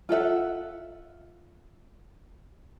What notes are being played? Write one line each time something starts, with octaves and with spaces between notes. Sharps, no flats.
F4 A4 E5 F#5